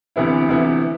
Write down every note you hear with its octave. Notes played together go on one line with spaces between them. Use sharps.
D2 C3 E3 B3 E4
D2 C3 E3 B3 E4